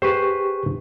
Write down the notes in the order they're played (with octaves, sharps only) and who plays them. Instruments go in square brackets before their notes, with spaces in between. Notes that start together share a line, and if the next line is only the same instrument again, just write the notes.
[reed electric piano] G4 G#4 C#6 [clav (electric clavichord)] B4 C5